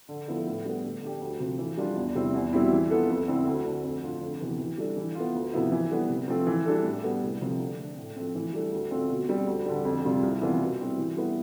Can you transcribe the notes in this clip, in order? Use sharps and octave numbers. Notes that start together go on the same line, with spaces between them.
D3
F3 B3 E4 A4
A2
G3 B3
D3
A3 D4 G4
D2
C3 F3
E3
G3 D4 F4
E2
C3 G3 C4 E4
E2
B2 G3 C4 E4
E3
B3 F4 A4
F2
D3 A3 C4 E4
D2
D3 A3
F2
D3 A3 D4 F4
F2
C3 E3 B3
E3
G3 D4 A4
E3
B3 F4
D2
C3 F3 B3 E4
E3
G3 B3
C3
F3 A3 C4
E3
G3 D4 A4
A2
G3 B3
C2
C3 F3 A3
D3
A3 D4
A2
F3 A3 C4
E3
G3 D4 A4
D2
D3 A3 C4 F4
B2
G3 C4
D2
D3 G3
F2
C3 G3 C4 F4
C2
C3 E3 B3 F4
B2
G3 C4 E4
E3
G3 B3 E4 B4